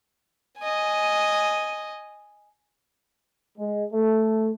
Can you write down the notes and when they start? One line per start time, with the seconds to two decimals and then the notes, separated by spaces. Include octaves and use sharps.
0.59 D#5 G#5
3.58 G#3
3.93 A3